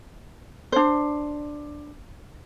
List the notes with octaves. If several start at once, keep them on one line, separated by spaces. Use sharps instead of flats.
D4 C5